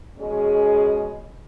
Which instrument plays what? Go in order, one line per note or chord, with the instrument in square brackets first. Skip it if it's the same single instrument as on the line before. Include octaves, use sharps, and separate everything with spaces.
[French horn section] B2 G#3 C#4 G#4